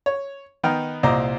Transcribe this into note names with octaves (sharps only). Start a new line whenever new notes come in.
C#5
D#3 B3 D#4 G5 F6
C2 A#2 C5 D#5 A#5 D6